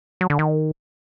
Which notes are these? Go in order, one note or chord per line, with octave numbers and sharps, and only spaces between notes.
F#3
D3
D#3